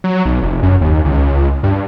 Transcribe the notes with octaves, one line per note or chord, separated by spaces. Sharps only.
F#3
B1
F1
F#2
D#2
C#2
G2